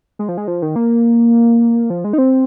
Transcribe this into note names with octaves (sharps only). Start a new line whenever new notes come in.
G#3
F3
G#3
F3
D#3
A#3
F3
G#3
D#4
C4